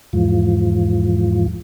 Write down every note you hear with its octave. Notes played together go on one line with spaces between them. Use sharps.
E2 G#2 F3